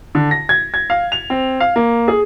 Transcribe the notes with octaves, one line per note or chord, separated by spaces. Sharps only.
D3
A#6
G#6
G#6
F5
F7
C4
F5
A#3
G#4